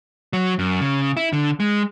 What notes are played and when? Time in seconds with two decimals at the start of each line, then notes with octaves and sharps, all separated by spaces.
0.33 F#3
0.59 F#2
0.81 C#3
1.17 E4
1.33 D3
1.60 G#3